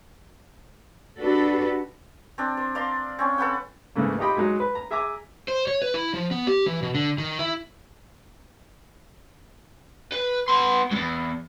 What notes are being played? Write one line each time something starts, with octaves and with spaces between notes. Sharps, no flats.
D4 F#4 G4 A4 B4
C4 D4
C5
D5 F5 A#5 C6
C4 C#4
A4 B4 F#5 G5
G#2 C#3 E3 A3 A#3
D#4 F4 G4 D#5 G5 B5
F#3 G#3 D#4
B4
A#5
G#4 E5 G#5 A#5 D6
C5
C#5
B4
E4
F3
B3
G4
E3
B2
D3
D#3
E4
B4
B3 C6
E2 G2